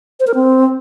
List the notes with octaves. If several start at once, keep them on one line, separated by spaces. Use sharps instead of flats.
C5
A#4
C4